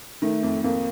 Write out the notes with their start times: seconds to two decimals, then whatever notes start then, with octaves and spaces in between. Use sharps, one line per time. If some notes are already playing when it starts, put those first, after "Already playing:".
0.22 D#3 A3
0.43 F2
0.64 F2 A#3